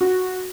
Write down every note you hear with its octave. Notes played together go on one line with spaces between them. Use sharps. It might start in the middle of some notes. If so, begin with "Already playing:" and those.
F#4